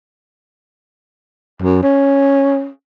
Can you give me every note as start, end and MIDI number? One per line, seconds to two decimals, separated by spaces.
1.62 1.81 42
1.83 2.69 61